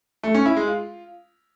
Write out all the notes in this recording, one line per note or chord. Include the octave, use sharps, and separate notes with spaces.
A3
C#4
E4
G#3
F4